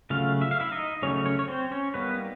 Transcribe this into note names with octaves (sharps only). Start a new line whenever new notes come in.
C#3 F#3 A3 F4 F5
E5
F5
E4 E5
D#4 D#5
C#3 F#3 A3 C#4 C#5
C#4 C#5
C#5
C4 C5
C#4 C#5
G3 A#3 B3 D#4 B4